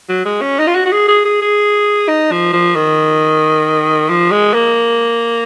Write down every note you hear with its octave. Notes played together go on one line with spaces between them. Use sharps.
F#3
G#3
C#4
D#4
F4
F#4
F#4
G#4
G#4
G#4
G#4
D#4
F3
F3
D#3
F3
G#3
A#3